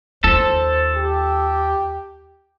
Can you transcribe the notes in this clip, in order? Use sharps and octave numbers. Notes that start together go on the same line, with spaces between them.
D#2 F4 A4 C5
G4